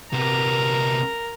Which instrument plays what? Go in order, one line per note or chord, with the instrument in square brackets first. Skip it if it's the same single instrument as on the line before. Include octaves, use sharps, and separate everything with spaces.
[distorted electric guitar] C3 B3 [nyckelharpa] A#4 A#5